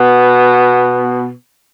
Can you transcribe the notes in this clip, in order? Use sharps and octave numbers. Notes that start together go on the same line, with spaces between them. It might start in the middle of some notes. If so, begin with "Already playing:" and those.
Already playing: B2 B3